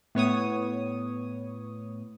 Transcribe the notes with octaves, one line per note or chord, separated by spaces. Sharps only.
A2 B3 C#5 D#6